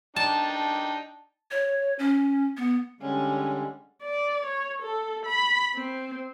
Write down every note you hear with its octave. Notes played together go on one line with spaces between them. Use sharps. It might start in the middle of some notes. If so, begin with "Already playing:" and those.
D4 D#4 G5 A5
C#5
C#4
B3
D3 G3 G#3 C#4
D5
C#5
A4
B5
C4